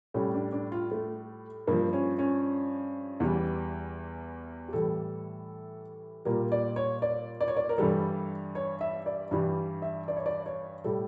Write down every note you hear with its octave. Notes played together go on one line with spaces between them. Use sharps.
A2 G3 C#4
D4
D4
F4
A3
G2 F3 A#3
C#4
C#4
E2 E3 G3
G4
A2 E3 G3 A4
A#2 G3 A#4
D5
C#5
D5
D5
C#5
D5
A#4
G2 E3 G3 A4
C#5
E5
D5
G2 E3 G3
E5
D5
C#5
D5
C#5
A2 G3 A4